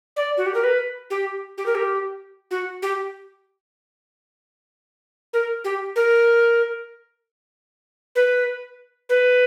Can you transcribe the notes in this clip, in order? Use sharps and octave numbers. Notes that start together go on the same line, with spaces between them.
D5
F#4
G4
A#4
B4
G4
G4
A#4
G4
F#4
G4
A#4
G4
A#4
B4
B4